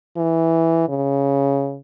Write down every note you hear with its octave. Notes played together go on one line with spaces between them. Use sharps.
E3
C#3